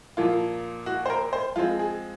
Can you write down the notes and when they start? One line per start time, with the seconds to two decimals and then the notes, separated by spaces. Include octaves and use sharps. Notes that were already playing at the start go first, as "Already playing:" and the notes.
0.17 A#2 F3 A#3 F4
0.86 F#4
1.06 C5
1.10 A#4
1.33 C5
1.56 F3 G#3 C4 F4
1.79 G#4